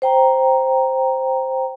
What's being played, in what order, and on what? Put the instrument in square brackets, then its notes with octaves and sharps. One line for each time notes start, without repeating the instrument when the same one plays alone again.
[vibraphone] C5 G5 A#5